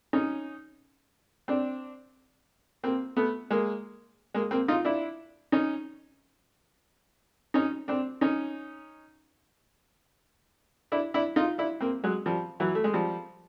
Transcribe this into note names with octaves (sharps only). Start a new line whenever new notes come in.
C#4 D#4
C4 D4
A#3 C4
A3 B3
G#3 A#3
G#3 A#3
A#3 C4
D#4 F4
D4 E4
C#4 D#4
C#4 D#4
C4 D4
C#4 D#4
D4 E4
D4 E4
D#4 F4
D4 E4
A#3 C4
F#3 G#3
F3 G3
E3 F#3
A3
G#3
F3 G3